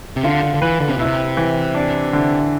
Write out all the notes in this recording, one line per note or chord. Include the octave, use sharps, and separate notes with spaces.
C3
D3 F4
D3
D3
E3 B4
D3
C3
B2 E4
C3
E3
D4
D3